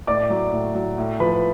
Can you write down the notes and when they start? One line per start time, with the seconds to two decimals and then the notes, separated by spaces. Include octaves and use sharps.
0.07 A2 D5 D6
0.30 F#3
0.52 A2
0.75 F#3
0.98 A2
1.20 F3 B4 B5